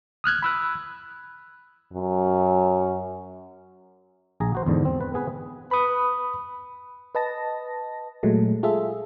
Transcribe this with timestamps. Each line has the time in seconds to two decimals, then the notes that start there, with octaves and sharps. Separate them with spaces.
0.24 D#6 F6 F#6 G#6
0.42 B5 E6 F#6
1.93 F#2
4.40 A#1 G#4 A#5
4.55 F#4 C5
4.66 E2 G#2 D3
4.85 C4
5.01 B4
5.14 B3 G#4 B4
5.71 B4 B5 D#6
7.15 B4 D#5 A5 A#6
8.23 A#2 F#3 G#3 A3
8.63 F4 G#4 A4 E5